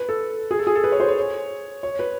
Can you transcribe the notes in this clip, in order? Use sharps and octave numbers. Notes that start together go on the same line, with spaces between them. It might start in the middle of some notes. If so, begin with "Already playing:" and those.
Already playing: B4
A4
G#4
A4
G#4
A4
B4
C#5
C5
C#5
C#5
B4